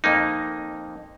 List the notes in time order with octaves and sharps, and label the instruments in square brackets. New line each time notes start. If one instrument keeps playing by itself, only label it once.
[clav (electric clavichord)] F2 A#3 D#4